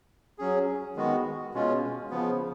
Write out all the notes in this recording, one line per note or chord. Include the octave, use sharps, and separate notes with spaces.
F#3 C#4 G#4
D#3 G#3 B3 F#4
B2 G#3 C#4 F4
C#3 F3 B3